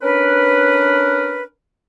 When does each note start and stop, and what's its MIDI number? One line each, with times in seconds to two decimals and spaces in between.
0.02 1.44 61
0.02 1.44 62
0.02 1.44 70
0.02 1.44 71